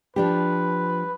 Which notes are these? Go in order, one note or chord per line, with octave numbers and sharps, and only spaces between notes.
F3 D4 G4 B4